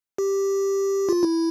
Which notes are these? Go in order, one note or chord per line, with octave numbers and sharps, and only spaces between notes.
G4
F4
E4